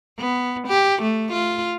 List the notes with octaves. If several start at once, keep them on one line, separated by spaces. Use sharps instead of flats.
B3
G4
A3
F4